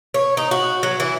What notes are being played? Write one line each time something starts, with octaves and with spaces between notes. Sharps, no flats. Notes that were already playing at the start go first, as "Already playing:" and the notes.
C#5
D#4
F#4
F#3
E3